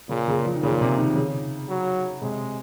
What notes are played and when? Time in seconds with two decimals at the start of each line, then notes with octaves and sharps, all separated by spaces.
0.09 A#2 C#3
0.28 C#3
0.45 F3
0.56 D#3
0.63 A#2 C#3
0.81 C3
0.98 D#3
1.16 C#3
1.69 F#3
2.22 C3 G#3